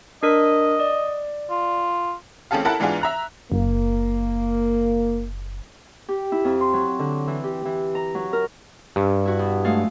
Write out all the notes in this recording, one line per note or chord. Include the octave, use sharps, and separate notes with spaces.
D4 A#4 D#5 B6
D5
F4
A1 C4 C#4 G#4 A4 F5
E4 A4 A#4 F#5 A5 B5
G#2 E3 B3 D4 F4 G#4
E5 A#5 F#6
F#1 A#3
G4
E4
F2
C6
F#3
D3
E3
G4
E3
A#5
F#3
A#4
G2
E4 F#4
B2
G#3 A3 F5